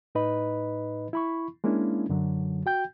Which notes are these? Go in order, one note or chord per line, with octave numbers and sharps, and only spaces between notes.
A2 D#4 B4 D#5 B5
E4 B5 C#6
G#3 A#3 C#4 D4 E4
F#2 D3 F#3
F#4 G5 G6